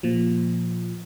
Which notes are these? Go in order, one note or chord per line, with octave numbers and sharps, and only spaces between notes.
A#2 F3